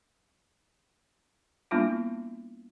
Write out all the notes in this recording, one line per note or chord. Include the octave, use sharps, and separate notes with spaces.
G3 A#3 B3 D4 E4 F4